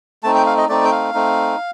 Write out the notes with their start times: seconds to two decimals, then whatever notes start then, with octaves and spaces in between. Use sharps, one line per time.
0.23 A3 C4 D#4 A5
0.35 G5
0.46 F5
0.57 D#5
0.69 A3 C4 D#4 D5
0.84 G5
0.92 F5
1.14 A3 C4 D#4